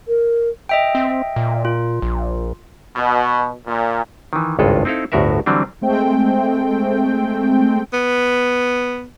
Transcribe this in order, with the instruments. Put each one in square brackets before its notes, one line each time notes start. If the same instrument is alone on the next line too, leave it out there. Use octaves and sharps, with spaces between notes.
[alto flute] A#4
[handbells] D#5 E5 G5
[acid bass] C4
A#2
[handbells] F4
[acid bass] A#1
[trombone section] B2
A#2
[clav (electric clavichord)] D#3 E3
G#1 C#2 G2 G#3 F4 A4
C4 D#4 E4 A4 F5
G1 D2 A2 F#4 A#4 E5
D3 E3 F#3 G3 C4 D4
[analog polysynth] G#3 A3 C4 G5
[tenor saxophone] B3